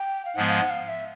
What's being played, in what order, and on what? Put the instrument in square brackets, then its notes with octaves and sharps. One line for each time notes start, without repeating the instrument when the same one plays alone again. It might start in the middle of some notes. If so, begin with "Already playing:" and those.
Already playing: [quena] G5
F5
[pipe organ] G#2 F3 G#3 B3 [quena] F#5
[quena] F5
F#5
F5
E5